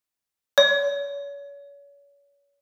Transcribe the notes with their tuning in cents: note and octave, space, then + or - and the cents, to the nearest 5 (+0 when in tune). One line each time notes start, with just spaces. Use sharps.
C#5 +35